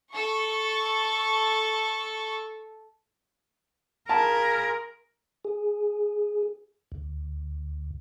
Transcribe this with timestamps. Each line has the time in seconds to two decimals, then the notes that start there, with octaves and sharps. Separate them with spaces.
0.12 A4 C#6
4.09 F4 G#4 A#4 A5 B5
5.45 G#4
6.92 D2